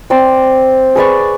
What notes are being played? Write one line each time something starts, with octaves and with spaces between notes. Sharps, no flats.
C4 D5 C6
G#4 B4 D5 C#6